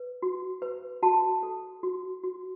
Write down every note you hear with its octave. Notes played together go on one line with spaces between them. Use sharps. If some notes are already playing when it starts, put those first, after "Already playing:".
Already playing: B4
F#4
B4
F#4 A5
A4
F#4
F#4